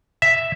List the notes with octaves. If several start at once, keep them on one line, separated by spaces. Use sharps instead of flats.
E5